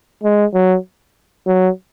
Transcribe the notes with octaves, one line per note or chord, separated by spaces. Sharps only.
G#3
F#3
F#3